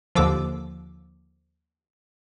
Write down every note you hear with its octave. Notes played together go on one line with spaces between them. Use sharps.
D#2 D3 F3 D6 E6